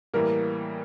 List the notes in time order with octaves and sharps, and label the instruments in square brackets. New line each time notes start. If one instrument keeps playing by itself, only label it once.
[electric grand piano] A2 E3 G3 A#3 [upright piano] A#4